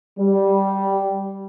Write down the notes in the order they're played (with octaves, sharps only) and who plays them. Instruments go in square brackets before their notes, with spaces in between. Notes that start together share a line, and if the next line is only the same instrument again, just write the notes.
[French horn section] G3